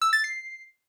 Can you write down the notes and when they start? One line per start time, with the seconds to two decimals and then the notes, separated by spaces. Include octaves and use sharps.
0.02 E6
0.13 A6
0.24 C7